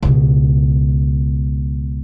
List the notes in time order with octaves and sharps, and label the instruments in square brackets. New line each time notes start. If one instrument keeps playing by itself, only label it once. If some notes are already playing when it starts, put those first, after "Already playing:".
[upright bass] C#2 B2